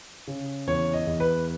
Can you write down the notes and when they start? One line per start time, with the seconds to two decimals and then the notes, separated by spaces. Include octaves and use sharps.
0.27 C#3
0.67 E2 C#5
0.93 D#5
1.07 E2
1.20 B4